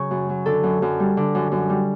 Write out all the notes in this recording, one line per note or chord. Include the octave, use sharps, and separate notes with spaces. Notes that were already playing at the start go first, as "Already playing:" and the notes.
Already playing: C#3 F#3 C#5
F#2
F#3
D3 A4
F#2
F#2
G3
D3
F#2
F#2
G3